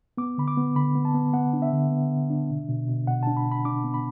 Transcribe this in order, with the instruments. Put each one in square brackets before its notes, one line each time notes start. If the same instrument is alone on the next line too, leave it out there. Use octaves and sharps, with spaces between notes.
[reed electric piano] B3 D6
D3 B5
D6
B3
D3 B5
B3
A5
B3
B3 F#5
D4
E5
D3
B3
D3
D4
B2
B2
B2
B2 F#5
D4 A5
B5
B2
B5
D4 D6
B3
B5